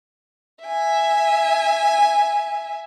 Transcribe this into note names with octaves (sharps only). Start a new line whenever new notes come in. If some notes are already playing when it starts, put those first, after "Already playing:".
E5 G#5